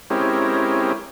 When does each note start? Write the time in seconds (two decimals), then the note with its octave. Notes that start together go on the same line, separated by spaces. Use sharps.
0.10 G#3 C4 C#4 E4 G4 A#4